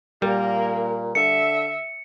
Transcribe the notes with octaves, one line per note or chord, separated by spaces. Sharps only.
A#2 G3 A#3 A#4
D3 E5 C#7